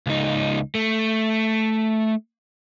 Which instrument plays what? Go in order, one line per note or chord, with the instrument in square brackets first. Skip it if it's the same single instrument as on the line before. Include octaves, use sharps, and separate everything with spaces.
[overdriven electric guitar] C#2 D#4
A3